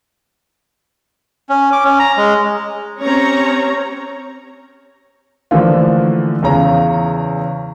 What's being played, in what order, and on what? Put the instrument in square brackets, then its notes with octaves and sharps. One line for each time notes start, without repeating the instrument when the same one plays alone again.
[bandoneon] C#4
D6
C#4
A#5
G#3
[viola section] C4 C#4 G4 C#5 A#5
[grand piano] D3 E3 F3 A3 A#3 F4
E2 C#3 C#4 A#5